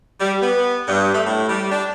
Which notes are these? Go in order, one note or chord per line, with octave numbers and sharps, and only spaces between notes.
G3
B3
G2
A3
A2
G3
D4